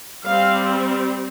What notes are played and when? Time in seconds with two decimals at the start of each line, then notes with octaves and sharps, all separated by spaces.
0.24 G3 C4 F5